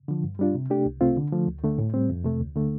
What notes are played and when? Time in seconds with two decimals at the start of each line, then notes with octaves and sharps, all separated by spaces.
0.08 D3 F3
0.24 G2
0.39 G3 D4 F4
0.55 C3
0.70 A3 D4 G4
0.86 C2
1.01 C3 A3 C4 F4
1.17 D3
1.32 F3 A3
1.47 D2
1.63 D3 A3
1.79 A2
1.94 G3 C4
2.10 F2
2.25 C3 A3
2.41 D2
2.56 D3 A3